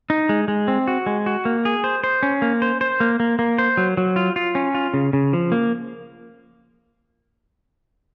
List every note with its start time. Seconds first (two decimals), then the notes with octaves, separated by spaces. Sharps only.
0.10 D#4
0.29 G#3
0.48 G#3
0.68 C4
0.88 F#4
1.06 G#3
1.26 F#4
1.45 A#3
1.65 G#4
1.84 C5
2.04 C5
2.23 C#4
2.42 A#3
2.62 C5
2.81 C5
3.00 A#3
3.20 A#3
3.39 A#3
3.58 C5
3.77 F#3
3.97 F#3
4.16 F4
4.36 F4
4.55 C#4
4.75 F4
4.94 C#3
5.13 C#3
5.33 F3
5.52 A#3